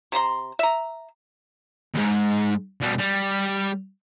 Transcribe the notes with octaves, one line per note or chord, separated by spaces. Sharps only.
C3 C5 A#5 C6
E5 A#5
D#2 G#2
B2 G3
G3